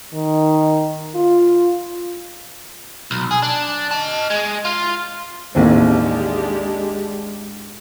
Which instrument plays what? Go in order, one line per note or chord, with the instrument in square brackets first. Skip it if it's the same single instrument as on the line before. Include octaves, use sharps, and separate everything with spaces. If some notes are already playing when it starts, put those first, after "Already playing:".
[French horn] D#3
F4
[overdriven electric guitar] B1
G#4
D4
D#5 A5
G#3
F4
[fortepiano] A1 D#2 C4 [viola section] G#3 D4 G4